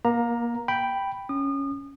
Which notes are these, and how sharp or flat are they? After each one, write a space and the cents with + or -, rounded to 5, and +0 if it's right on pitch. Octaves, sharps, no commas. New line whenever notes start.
A#3 +25 A#5 +0
G5 +0 B5 +0
C#4 +0 D#6 -35